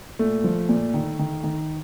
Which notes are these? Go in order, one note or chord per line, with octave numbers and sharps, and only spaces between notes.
A#2 A3
F3
A#2
D#3
D#3
D#3